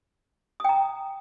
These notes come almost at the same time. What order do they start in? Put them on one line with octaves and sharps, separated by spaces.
D#6 G5 A#5